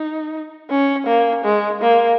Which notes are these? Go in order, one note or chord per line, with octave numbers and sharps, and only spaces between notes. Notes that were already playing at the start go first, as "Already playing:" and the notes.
Already playing: D#4
C#4
A#3
G#3
A#3